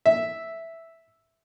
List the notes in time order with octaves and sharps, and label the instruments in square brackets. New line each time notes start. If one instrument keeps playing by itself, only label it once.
[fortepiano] E5